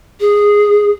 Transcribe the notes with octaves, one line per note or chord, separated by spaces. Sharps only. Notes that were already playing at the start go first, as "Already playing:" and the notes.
G#4